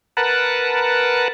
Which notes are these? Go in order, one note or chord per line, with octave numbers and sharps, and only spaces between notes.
A#4 B4 F#5 A5